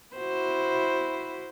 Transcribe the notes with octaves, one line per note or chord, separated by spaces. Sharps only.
E4 F#4 C5